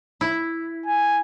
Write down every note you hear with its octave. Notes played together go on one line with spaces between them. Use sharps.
E4
G#5